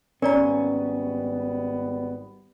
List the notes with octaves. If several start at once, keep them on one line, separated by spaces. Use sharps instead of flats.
G#1 G3 B3 C#4 A#4 D5 A#5